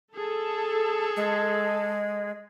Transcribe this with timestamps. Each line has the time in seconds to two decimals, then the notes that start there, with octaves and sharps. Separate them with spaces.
0.15 G#4 A4
1.16 G#3